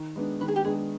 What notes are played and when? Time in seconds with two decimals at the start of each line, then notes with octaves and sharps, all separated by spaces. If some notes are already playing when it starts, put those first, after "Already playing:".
Already playing: D#3
0.16 G#3 B3 D4
0.41 D#3 B4
0.48 G#4
0.56 G4
0.65 G#3 B3 D4 G#4